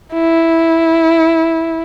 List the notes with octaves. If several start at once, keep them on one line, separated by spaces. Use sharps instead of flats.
E4